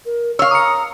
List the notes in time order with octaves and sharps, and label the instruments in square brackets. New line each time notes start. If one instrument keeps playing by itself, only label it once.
[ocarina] A#4
[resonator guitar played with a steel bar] C#5 F5 [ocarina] C#6 [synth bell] E6
[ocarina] A#5 [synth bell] D#6 C#7